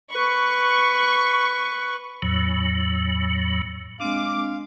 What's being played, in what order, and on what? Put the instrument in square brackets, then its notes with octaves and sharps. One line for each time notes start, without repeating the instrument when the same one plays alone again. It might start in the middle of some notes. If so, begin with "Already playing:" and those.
[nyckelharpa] B4 [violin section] C#6
[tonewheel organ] E2 A2 F#3
[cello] G#3 [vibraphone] C4 D4 [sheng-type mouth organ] F5 [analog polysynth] D6